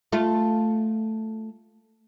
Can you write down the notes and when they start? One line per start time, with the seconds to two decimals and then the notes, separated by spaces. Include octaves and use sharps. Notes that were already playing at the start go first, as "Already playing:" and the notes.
0.12 A3 F4